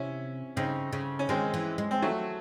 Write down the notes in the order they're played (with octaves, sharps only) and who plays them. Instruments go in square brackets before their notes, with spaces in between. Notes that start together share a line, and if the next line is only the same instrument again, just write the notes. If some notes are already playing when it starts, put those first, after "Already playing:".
Already playing: [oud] C3 [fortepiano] C#4 E4
[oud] C#3 [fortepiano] C4 D#4
[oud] C#3
[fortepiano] C#4
[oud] D#3 [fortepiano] G#3 C4
[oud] E3
G#3
[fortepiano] C4
F#3 A3